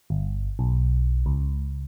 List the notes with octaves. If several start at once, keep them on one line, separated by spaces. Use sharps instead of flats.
G1
B1
C#2